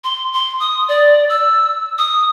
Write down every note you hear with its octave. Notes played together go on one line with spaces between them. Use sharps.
C6
C6
D#6
D5
E6
D#6